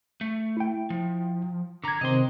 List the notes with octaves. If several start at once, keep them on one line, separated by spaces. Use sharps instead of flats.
A3
E4 G5
F3
D3 A#5 D6 G#6
C3 D#3 C4 D#5 C6